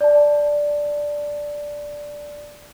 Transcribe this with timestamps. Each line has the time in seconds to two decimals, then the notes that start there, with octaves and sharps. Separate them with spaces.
0.01 D5 A5